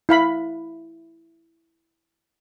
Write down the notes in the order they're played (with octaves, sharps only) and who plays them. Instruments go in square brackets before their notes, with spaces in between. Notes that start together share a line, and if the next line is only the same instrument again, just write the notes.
[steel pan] E4 F5 B5